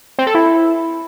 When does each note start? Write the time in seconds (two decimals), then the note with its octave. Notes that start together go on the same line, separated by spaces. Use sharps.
0.19 C4
0.27 A4
0.35 E4